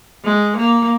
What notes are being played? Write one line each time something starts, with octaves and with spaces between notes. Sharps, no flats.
G#3
A#3